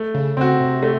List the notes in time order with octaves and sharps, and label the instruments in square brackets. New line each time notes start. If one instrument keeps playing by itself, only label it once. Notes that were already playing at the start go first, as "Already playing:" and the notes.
Already playing: [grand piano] A3
[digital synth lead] C#3
[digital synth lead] C#3 [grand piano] C4 F#4
[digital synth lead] C3
[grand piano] A3